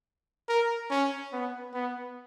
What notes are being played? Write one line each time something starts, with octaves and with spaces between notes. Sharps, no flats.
A#4
C#4
B3
B3